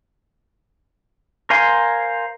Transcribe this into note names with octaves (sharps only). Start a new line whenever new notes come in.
A#4 C5 F5 G#5 C6